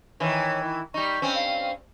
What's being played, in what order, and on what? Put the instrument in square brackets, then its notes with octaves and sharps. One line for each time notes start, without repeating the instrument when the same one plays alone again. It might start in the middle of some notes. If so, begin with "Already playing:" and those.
[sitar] D#3 E3 [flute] C#5
[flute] E4
[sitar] G3 D#4 [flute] C#6
[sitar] G2 C4 C#4
[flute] F5